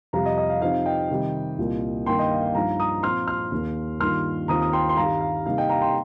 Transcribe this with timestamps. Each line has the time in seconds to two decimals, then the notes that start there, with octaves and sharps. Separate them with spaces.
0.13 F2 C3 G3 F5 A#5
0.25 D#5
0.38 D#5
0.50 F5
0.61 C3 F3 C4 D#4 F5
0.85 D#5 G5
1.10 C3 D#3 G3 D#4
1.59 C2 A#2 A#3 F4
2.06 G2 D#3 A#3 G5 C6
2.19 D#5 G5
2.31 F5
2.42 F5
2.55 G2 F3 D#4 F5 A#5
2.80 A#5 D#6
3.03 A#2 F3 C4 F4 C6 F6
3.27 C6 F6
3.52 D#2 D#3 A#3
4.00 G2 D#3 A#3 F4 C6 F6
4.48 D#2 D#3 C4 F4 A#5 D#6
4.62 D#6
4.73 G5 C6
4.89 C6
4.97 G2 D#3 G3 F5 A#5
5.21 F5
5.46 C3 G3 A#3 D#4 F5
5.58 D#5 G5
5.69 F5 A#5
5.81 G5 C6